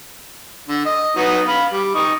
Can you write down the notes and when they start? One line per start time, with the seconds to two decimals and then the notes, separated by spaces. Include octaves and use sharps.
0.68 D3
0.85 D#5
1.16 F#3 B3 D#4
1.48 F5 B5
1.71 G3
1.95 D#4 C#6 D#6